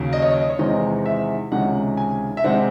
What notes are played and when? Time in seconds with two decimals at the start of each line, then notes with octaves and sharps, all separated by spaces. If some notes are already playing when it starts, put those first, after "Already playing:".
Already playing: D#2 C#3 F#3
0.13 D#5
0.22 C#5
0.31 D#5
0.50 C#5
0.59 E2 C3 D#3 G#3 C4 D#5
1.06 E5
1.51 C#2 C3 D#3 G#3 C#4 F#5
1.97 G#5
2.37 E5
2.44 C3 D#3 G#3 C4 F#5